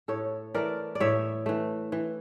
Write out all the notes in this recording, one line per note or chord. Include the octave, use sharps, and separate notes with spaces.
A2 A4 C#5
E3 A3 A#4 D5
D5
A2 C#5 E5
E3 A3
E3